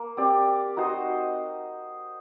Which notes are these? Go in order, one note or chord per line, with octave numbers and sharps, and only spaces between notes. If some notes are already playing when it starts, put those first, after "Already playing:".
Already playing: A#3
C4 G4 D5
D#4 F#4 C5 D#5